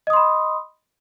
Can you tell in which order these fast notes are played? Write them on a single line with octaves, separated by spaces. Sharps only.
D#5 D#6 C6 B5